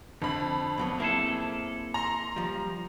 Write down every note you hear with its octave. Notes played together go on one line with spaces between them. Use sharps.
F2 D3 B5
A#2 F#3 B3
A#3 C4 E4 G#4 A4
A#5 C6
F3 G3